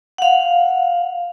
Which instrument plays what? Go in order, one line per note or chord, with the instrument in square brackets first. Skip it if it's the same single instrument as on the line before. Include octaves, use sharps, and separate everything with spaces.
[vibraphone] F5 F#5